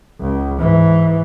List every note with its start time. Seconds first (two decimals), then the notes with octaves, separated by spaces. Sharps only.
0.20 C#2
0.59 G#2 E3